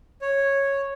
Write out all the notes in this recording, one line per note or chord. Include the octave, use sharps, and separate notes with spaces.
C#5